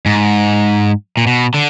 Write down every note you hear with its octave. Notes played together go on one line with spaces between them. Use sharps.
G#2
A#2
B2
D3